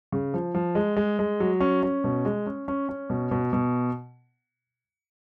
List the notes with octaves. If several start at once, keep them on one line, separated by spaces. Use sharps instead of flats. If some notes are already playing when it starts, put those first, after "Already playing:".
C#3
F3
F3
G#3
G#3
G#3
F#3
C#4
C#4
B2
G#3
C#4
C#4
C#4
B2
B2
B2